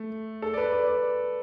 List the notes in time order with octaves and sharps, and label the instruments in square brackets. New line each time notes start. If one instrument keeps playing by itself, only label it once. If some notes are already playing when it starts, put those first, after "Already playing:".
Already playing: [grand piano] A3
A4
D5
B4
D5
D5